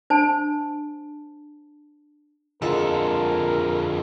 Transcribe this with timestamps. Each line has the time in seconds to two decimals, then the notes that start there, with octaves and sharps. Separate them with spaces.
0.10 D4 C5 G#5 A5
2.62 F2 D3 G#3 F4 A4 A#4 C6